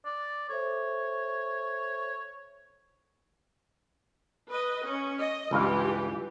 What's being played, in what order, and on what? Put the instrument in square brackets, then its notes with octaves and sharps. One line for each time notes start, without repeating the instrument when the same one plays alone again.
[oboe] D5
[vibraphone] A4 C5 E5 [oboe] C#5
[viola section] B4 D#5
C#4
D#5
[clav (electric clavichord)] C#2 G2 F5 [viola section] E3 G4